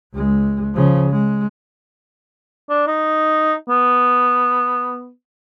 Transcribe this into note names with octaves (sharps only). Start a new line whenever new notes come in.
C#2 G#3
C#3 F3
G#3
D4
D#4
B3